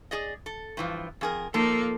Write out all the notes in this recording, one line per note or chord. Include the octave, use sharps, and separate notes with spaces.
G#4 D5 D#5
A4
G2 E3 F3
F2 G#4 A#4
F3 A#3 D#4 A4